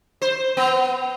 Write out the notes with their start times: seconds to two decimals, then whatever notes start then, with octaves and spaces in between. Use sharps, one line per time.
0.22 C5
0.57 B3